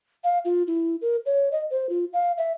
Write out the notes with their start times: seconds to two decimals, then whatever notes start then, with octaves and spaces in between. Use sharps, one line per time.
0.24 F5
0.45 F4
0.67 E4
1.02 A#4
1.26 C#5
1.52 D#5
1.70 C5
1.89 F4
2.13 F5
2.38 E5